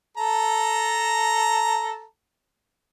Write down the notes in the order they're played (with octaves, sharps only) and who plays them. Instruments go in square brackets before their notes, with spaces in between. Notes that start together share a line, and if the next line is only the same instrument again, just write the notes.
[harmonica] A4 A5 A#5